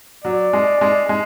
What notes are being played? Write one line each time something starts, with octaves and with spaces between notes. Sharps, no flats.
F#3 D5
G#3
G#3
G#3